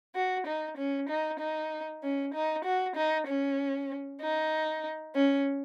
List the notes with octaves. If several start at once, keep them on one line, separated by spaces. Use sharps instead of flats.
F#4
D#4
C#4
D#4
D#4
C#4
D#4
F#4
D#4
C#4
D#4
C#4